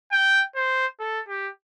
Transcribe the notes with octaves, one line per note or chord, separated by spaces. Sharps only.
G5
C5
A4
G4